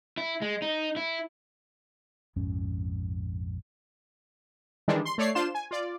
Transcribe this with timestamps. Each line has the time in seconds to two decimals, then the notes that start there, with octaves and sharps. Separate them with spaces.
0.18 E4
0.42 G#3
0.62 D#4
0.97 E4
2.36 A#1 F2 G#2 C#4
4.88 D#3 E3 G3 G#3 D4
5.05 C6
5.18 A3 C#5 D5 C7
5.35 D4 F4 C5 C6 E7
5.55 G#5
5.71 F4 D5